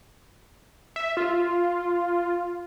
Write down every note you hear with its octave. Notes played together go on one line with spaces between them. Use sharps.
E5
F4